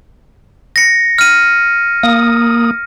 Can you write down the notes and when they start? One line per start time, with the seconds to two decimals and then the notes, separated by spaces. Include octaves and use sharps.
0.76 A#6 C#7
1.18 F6 D#7
2.03 A#3 D#6